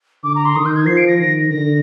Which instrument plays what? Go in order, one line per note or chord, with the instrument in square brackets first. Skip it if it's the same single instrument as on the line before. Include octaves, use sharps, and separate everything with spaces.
[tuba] D3 [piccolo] D6
[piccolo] A#5
C6
[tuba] D#3 [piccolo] D#6
[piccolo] G6
G#6
[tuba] F3 [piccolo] C7
[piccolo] D7
A#6
[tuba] D#3 [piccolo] A#6
[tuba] D3 [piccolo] A#6